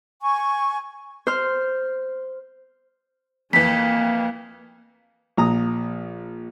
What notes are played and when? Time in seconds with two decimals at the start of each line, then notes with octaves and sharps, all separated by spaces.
0.22 G#5 C#6
1.27 C5 F6
3.53 F2 E3 A#3 B6
5.37 A#1 A#5 D#6